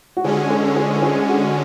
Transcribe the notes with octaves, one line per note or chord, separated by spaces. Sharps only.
F#4
D3 G#3 C#4 G#4
A4
G#4
A4
G#4
F#4